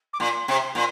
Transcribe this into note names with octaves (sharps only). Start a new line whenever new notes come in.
D6
A#2 C6
C3
A#2